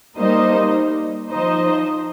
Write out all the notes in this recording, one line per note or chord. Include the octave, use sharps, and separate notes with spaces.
G3 A#3 D#4 C5 D#5
F3 D#4 C5 D#5